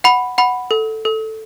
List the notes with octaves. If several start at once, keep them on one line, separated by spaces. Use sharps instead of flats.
F#5 B5
F#5 B5
A4
A4